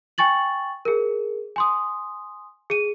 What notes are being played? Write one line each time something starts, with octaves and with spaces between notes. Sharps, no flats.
G5 G#5 C#6 A6 F#7
G#4 A#4
G#5 C6 D#6
G#4 D#7